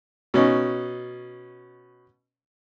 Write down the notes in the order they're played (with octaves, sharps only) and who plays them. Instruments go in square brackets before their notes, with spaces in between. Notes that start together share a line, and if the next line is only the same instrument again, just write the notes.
[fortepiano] B2 C#4 D#4